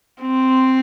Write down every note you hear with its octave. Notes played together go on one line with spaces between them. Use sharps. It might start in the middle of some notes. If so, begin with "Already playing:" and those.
C4